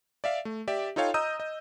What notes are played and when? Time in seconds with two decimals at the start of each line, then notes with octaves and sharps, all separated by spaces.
0.24 D5 E5 F5
0.45 A3
0.68 G4 D5 E5
0.96 D#4 F4 A4 C#5 F5 G5
1.14 D#5 A#5 D#6 E6 G6 D#7
1.40 D#5